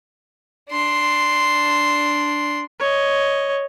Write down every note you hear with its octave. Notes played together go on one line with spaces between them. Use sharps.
D4 C6
C#5 D#5